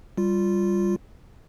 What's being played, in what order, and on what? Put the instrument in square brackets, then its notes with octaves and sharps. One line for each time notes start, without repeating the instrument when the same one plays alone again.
[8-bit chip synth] G3 F4